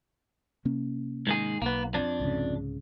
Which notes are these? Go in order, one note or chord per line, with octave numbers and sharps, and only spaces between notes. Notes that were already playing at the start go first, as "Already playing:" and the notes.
C3 A#3 C#4
G#2 D#3 G#4
B1 A#3 B3
F2 D4
C2 G#2 C#3